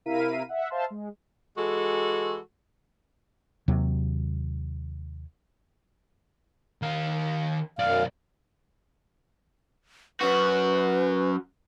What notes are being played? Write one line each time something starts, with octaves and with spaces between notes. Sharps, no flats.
C3 E4 A#4 F5 B6 D#7
E5 F#5
C5 E5 F5 A5 C6
G#3
E3 G#3 F#4 A4
D#2 C3 F#3
D#3 F5
B1 F#2 D5 F5
F#2 F#4 B4